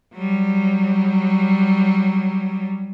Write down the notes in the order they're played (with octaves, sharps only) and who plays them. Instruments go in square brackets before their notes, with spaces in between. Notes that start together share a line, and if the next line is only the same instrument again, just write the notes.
[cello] F#3 G3